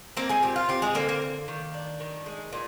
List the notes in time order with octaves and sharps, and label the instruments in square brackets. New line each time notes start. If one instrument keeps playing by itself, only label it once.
[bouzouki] A#3 C4 A#4
G#3 G#4
A#2 G4
F4
C4 G4
G#3 G#4
D3 A#3 A#4
A#3 A#4
A#3
D#3
D4
D#3
G#3
A#2